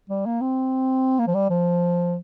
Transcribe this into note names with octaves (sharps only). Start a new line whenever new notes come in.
G3
A#3
C4
A#3
F3
G3
F3